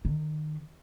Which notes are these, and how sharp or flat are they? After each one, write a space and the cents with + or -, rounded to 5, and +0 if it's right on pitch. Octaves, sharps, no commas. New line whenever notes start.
D#3 -25